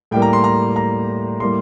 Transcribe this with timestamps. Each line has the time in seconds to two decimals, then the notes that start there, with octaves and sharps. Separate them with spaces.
0.11 A2 G3 A#3 G5
0.22 A#5
0.33 C6
0.44 A#5
0.76 A#5
1.40 A2 G3 A#3 C6